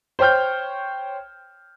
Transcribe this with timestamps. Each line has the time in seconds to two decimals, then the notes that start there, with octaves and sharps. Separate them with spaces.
0.19 C5 C#5 G5 F6 G6